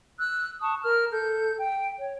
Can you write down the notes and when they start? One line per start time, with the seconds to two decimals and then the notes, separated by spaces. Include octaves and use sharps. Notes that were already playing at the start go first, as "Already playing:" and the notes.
0.19 E6 F#6
0.60 A5 C#6 D#6
0.83 A#4 F6
1.12 A4 G6
1.59 G5
1.99 C#5